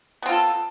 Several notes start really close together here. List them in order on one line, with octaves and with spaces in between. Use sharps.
B3 C4 F4 A4